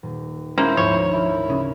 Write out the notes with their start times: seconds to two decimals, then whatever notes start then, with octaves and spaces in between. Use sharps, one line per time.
0.03 D#1
0.58 G#3 A#3 C#4 E4 C5
0.77 D2 G#2 F3 C#5
1.12 E4 F4 A#4 F6
1.50 C#3